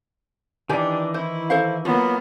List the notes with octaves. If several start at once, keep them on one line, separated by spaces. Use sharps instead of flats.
D#3 E3 D4 D#4 G4 G#5
E4 C5
A4 C5 F5
F#3 A#3 B3 F4